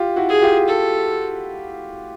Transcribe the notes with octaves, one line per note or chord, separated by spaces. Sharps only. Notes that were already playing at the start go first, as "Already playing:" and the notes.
Already playing: F4 G4
E4 F#4
G#4
F4 G4
A4